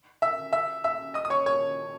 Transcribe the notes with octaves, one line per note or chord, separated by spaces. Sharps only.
E5 E6
E5 E6
E5 E6
D#5 D#6
D#6
C#5 C#6
C#5 C#6